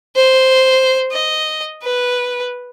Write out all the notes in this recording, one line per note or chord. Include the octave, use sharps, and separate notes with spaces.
C5
D#5
B4